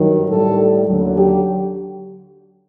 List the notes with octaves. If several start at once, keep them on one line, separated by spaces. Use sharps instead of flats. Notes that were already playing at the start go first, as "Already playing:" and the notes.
Already playing: G2 D#3 F#3
A2 G3 A4
D#2 D3 F#3
G4